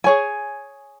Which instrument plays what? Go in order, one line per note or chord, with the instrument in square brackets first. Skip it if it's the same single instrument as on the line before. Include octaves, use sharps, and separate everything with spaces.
[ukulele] G#4 C#5 G#5